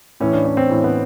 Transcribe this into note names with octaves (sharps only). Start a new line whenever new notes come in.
A2 E3 C#4
D4
C#4
C4
A2 E3
B3